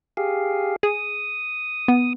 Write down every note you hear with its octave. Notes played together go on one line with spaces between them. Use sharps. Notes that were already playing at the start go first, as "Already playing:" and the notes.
G4 G#4 F5
G#4 D#6
B3